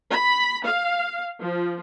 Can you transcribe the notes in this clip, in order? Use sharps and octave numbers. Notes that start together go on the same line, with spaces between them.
B5
F5
F3